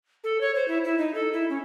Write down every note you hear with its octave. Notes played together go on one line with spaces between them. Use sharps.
A4
C#5
C5
E4
E4
D#4
A4
E4
C#4